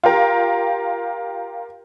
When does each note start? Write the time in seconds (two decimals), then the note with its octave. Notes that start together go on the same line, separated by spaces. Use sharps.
0.04 F4 G4 A#4